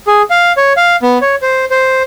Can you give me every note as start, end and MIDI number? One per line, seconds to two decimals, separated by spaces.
0.07 0.22 68
0.30 0.52 77
0.57 0.73 73
0.77 0.96 77
1.02 1.18 59
1.22 1.36 73
1.42 1.65 72
1.71 2.03 72